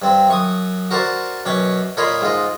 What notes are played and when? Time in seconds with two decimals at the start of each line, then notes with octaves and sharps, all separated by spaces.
0.02 G2 C4
0.28 F#2 C#6 D#6
0.91 F#4 A#4 C5 D5
1.45 F#2 B2 C#4 D6
1.97 A#2 A#4 C#5 D#5 B5 C6
2.21 G#2 F4 D#5